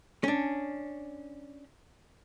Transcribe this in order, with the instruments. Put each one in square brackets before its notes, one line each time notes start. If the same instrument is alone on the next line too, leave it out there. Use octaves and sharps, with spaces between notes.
[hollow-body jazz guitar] C#4 D4